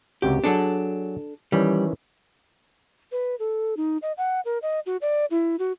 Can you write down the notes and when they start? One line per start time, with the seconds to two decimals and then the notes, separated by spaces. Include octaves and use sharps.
0.22 C#2 C3 F#4 G4
0.44 F#3 D4 G#4 A4
1.52 D#3 E3 G3 C#4
3.12 B4
3.39 A4
3.77 D#4
4.02 D#5
4.18 F#5
4.45 A#4
4.62 D#5
4.86 F#4
5.02 D5
5.31 E4
5.59 F#4